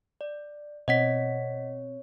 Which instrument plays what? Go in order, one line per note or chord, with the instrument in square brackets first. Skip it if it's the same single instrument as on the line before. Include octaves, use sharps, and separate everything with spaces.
[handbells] D5
[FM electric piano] B2 C4 [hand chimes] C#5 [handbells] D#5 F#5 B6